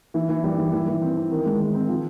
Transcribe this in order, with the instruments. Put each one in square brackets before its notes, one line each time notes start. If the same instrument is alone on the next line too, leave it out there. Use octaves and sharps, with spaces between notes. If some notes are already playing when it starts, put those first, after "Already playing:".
[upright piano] E3
E3
G3
E3
E3
E3
C4
C4
D#3
G#3
D#3
C4
F3